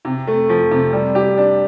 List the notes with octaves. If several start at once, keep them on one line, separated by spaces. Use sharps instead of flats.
C3
A3
F3
C3
G3
G4
D4